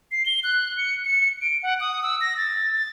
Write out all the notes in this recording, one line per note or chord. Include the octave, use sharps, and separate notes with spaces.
C7
G7
F#6
C#7
C#7
D7
F#5
D#6
E6
A#6
A6
A6